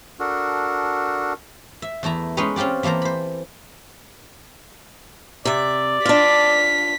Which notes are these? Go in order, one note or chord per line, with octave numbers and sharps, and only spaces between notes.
D4 F#4 A4 A#4
E5
E2 A3 E4 A#5
G#3 C#4 D#4 G#4 B4 C#5
C4 C#4 F4 G4 D5
E3 A#3 A4 C5 A#5
C5 B5
C3 D5 E5
D4 F4 B6